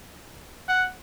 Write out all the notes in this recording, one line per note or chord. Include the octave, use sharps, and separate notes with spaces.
F#5